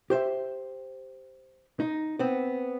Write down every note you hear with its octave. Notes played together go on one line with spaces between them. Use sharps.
G4 C5 E5
D#4
B3 C4